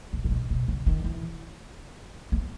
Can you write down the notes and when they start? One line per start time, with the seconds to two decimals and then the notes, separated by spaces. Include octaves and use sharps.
0.13 B2
0.24 A#2
0.31 B2
0.50 B2
0.68 C#3
0.86 D#3
1.04 E3
2.32 B3